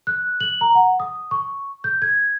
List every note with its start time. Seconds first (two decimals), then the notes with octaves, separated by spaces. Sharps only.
0.07 F#6
0.40 F#7
0.61 A#5
0.75 F#5
1.00 D#6
1.31 C#6
1.84 G6
2.02 G#6